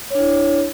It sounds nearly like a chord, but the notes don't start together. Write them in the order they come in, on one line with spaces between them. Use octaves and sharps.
C#5 D4 E4